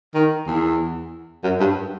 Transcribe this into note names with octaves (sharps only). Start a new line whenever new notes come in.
D#3
E2
F#2
G2